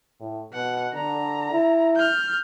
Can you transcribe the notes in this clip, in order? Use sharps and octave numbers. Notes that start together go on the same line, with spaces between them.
A2
B2 F#5
D3 A#5
E4
F6 G6